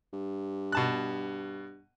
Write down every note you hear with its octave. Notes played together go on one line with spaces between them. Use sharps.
G2
B2 A5 F#6